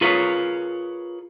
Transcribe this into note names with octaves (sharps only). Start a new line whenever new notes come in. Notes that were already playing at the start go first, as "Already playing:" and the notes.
F4 G#4 A#4 B4 C#5